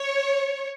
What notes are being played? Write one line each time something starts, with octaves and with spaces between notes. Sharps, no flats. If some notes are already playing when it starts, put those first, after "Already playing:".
Already playing: C#5